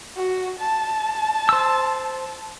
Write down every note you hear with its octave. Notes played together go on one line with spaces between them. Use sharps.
F#4
A5
C5 E6